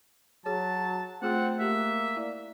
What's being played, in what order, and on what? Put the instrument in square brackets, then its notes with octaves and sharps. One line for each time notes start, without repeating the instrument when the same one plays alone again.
[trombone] F#3 [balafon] F#4 G#4 C#5 [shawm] A5
[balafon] A3 F4 G#4 [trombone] C4 [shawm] F#5
[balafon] A3 G4 [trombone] A#3 [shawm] E5
[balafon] E4 D5